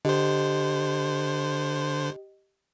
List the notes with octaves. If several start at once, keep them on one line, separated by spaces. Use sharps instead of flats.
D3 G4 C5 D#5